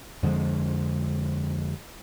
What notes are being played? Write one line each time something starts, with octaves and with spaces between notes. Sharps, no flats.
F2 D3 F3 G#3